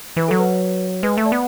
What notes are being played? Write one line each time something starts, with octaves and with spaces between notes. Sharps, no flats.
E3 B4
F#3 A4
B4
G#3 B4
A3 E5
D5
B3